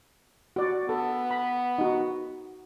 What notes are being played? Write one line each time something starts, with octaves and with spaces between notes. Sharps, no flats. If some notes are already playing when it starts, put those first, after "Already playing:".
F#4 D5
B3 A4
B5
D#4 F#4